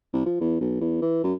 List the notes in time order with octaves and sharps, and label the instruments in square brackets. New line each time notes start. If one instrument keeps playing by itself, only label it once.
[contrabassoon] C2
F3
E2
B1
E2
E3
F#2